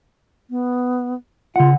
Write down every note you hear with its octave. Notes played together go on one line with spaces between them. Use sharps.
B3
C#3 F4 F#5